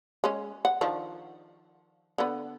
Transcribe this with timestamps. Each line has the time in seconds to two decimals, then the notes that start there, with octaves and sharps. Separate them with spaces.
0.24 G#3 C#4
0.65 F#5
0.81 D#3 F3 D4
2.18 D3 B3